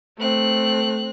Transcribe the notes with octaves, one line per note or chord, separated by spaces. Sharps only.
A3 C4 F#6